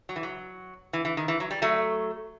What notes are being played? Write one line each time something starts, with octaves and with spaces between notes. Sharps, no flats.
F#3
E3
F#3
E3
E3
D#3
E3
F#3
G3
F#3 A3